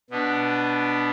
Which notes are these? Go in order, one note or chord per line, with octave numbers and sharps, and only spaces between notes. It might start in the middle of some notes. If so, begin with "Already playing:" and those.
B2 B3 D4